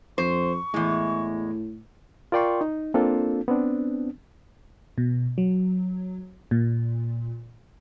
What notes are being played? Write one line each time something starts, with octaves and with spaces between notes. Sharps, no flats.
F2 C5 C#6
E2 A2 G#3
F4 A#4 D5 G5 C6 C#6
D#4
A#3 C4 D4 F4 A4
B3 C4 D4
B2
F#3
A#2